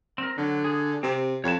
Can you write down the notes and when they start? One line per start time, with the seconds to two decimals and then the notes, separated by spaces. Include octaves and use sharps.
0.18 C4 A#4
0.38 D3 F#3
0.64 G#4
1.03 C3 C4
1.44 F2 C#5 A5